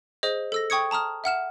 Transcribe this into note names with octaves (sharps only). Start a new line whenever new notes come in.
G#4 C5 D#5
A4 E6 A#6
G5 C#6 D#6 G#6 C#7
A5 A#5 D#6 F6
E5 F#5 F6 E7